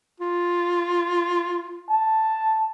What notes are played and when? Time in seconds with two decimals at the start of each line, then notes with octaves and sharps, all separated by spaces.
0.20 F4
1.89 A5